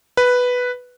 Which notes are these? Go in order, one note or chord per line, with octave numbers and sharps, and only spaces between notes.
B4